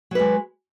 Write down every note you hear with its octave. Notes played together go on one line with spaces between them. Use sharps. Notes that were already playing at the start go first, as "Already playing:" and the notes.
F#3 G#3 B4